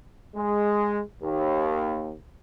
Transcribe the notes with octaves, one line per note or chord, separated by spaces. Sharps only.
G#3
D#2